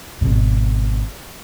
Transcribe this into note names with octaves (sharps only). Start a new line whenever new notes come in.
G#1 B2